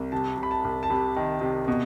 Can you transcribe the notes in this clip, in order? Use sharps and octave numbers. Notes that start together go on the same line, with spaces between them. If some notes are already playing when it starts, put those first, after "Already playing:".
Already playing: C2
C3 A5
C3
B5
A5
C2
A5
C3 B5
D#3
C3
B2